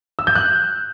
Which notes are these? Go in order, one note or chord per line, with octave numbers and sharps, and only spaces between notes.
E6
G6
F#6